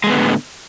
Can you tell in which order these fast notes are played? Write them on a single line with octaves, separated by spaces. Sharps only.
G#3 A3 B3 D3 A2